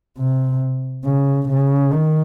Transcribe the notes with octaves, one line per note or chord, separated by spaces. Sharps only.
C3
C#3
C#3
D#3